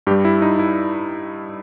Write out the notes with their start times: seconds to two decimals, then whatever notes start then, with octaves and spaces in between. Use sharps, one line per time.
0.07 G2 G4
0.11 G3
0.25 E4
0.42 D#4
0.59 E4